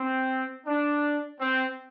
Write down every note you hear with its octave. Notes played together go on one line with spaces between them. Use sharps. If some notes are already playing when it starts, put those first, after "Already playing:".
Already playing: C4
D4
C4